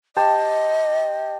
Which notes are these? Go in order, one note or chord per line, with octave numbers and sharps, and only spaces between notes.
G4 C5 D#5 A5